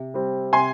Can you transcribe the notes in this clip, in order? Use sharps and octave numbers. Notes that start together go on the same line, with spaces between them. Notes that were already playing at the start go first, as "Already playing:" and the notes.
Already playing: C3
G3 C4
C3 G#5 C6